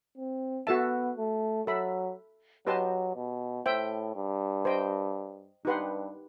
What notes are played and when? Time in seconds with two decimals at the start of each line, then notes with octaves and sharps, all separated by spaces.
0.17 C4
0.67 B3 F#4 A4 E5 A5
1.17 A3
1.67 F#3 A4 E5 B5
2.66 F#3 G4 B4 D#5 A5 C6
3.16 B2
3.66 A2 C5 E5 G5
4.15 G2
4.65 C5 D#5 G5
5.65 G2 D#4 G4 B4 F#5 C6